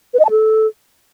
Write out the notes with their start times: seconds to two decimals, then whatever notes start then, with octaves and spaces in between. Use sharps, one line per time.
0.14 B4
0.19 D#5
0.25 A5
0.30 A4